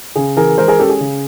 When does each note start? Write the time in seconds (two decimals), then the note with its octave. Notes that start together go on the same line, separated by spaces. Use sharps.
0.15 C#3 G#4
0.37 E3 G#4 A#4
0.58 G#3 A#4 C5
0.68 G#4 A#4
0.79 C#4 G4 A4
0.89 G#4
1.00 C#3